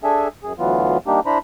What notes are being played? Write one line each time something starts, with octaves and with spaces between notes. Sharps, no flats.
D4 G#4 A4 E5 G#5
F#2 G#4
D2 E3 F#3 B3 F4
G3 A#3 D4 D#4 G4
D4 E4 C5 A#5 B5